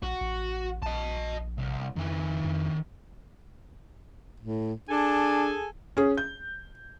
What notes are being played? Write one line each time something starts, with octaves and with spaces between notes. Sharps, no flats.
A#1 F#4
A1
A#1 D#5 A5
C2
F2 D#3 E4
F2
A2
D4 G#4 A4 G#5
C#4 G#4
G6